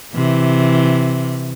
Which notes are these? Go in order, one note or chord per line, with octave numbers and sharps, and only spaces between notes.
C3 E3